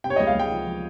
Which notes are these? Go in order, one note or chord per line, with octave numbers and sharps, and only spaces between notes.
C3 G5
C#5
C#2 D#5
F5
C#2 G5
F3
F3